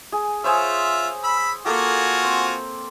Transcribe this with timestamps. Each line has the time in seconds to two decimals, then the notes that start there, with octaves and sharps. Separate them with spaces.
0.12 G#4
0.44 F4 G#4 C5 C#5 E5
1.24 B5 E6
1.66 A#3 F4 F#4 G#4 A4
2.24 C4